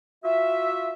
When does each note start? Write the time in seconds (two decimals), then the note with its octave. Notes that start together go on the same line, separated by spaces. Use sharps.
0.24 F4 F#4 E5